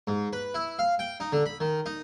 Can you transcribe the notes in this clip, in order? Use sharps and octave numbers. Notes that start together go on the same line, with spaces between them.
G#2
B4
E4
F5
G5
D#4
D3
B5
D#3
D#4